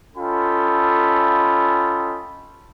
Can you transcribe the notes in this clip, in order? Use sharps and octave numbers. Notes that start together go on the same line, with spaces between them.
C#4 F4 A4 D#5 G5 B5